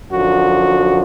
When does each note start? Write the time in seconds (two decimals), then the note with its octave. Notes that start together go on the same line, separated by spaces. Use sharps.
0.11 F#2 D3 F3 F#4